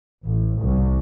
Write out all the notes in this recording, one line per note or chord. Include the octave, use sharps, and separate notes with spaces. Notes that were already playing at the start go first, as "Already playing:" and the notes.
A1
C2